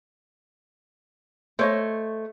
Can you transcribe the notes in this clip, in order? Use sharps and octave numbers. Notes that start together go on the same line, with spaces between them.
A3 C5 C#5 D#5